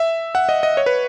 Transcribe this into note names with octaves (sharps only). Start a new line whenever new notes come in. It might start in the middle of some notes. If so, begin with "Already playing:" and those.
Already playing: E5
F#5
D#5
D#5
C#5
B4